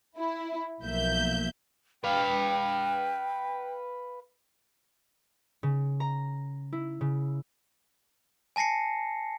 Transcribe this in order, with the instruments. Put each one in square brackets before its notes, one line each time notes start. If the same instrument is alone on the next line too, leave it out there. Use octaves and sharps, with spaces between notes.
[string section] E4
B1 F3 A#3 E5 G6
[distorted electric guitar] B4 F5 [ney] G5
[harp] C#3
A#5
E4
C#3
[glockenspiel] G#5 A5 A#6 C7 C#7